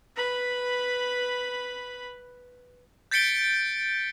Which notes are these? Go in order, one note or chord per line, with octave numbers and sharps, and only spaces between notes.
B4 B5
G6 A6 B6 C#7 D7 G7